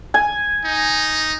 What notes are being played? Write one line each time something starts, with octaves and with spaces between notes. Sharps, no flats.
G#5
D#4